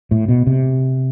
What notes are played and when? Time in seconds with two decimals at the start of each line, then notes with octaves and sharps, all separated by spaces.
0.11 A2
0.28 B2
0.47 C3